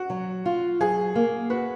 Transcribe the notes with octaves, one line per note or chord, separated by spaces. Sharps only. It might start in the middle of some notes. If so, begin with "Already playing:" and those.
Already playing: F#4
F#3
F4
F#3 G#4
A#3
F#4 B4